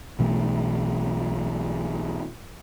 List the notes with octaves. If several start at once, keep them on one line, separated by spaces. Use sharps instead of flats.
B1 B2 E3 A3